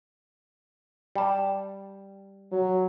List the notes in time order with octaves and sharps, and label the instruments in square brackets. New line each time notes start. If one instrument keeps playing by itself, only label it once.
[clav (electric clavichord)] G3 A5
[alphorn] F#3